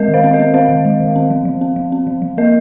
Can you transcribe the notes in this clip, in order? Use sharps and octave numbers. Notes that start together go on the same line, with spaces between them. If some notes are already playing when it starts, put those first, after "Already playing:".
Already playing: G#3 C4 A#4 D#5
D#3
C5 F5
C4
A#4 D#5
C4
C4 C5 F5
D#3
G#3
D#3
C4
F3
F3
C4
F3
C4
F3
F3
A#3 A#4 D#5